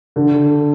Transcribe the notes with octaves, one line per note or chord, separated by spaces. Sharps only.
D3